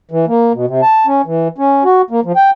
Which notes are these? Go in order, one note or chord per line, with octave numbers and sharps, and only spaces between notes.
E3
A#3
B2
C3
A5
C#4
E3
C#4
F#4
A#3
F3
G5